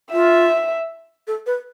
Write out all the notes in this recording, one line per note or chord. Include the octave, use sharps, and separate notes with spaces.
F4 E5
A4
B4